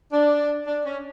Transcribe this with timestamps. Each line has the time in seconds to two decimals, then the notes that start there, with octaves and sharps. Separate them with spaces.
0.11 D4
0.66 D4
0.84 C#4